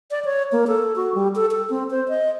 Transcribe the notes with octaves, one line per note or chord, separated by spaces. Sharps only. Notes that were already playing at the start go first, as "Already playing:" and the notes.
D5
C#5
A#3
A4
F#4
G3
A4
A4
C4
C5
D#5